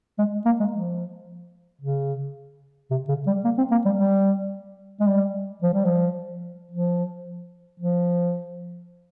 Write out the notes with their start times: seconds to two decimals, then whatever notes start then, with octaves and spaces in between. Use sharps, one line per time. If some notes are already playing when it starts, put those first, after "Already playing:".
0.19 G#3
0.46 A#3
0.60 G#3
0.73 F3
1.82 C#3
2.91 C3
3.09 C#3
3.27 G3
3.44 A#3
3.58 C4
3.71 A#3
3.85 G3
3.99 G3
5.00 G#3
5.07 G3
5.63 F3
5.74 G3
5.85 F3
6.71 F3
7.79 F3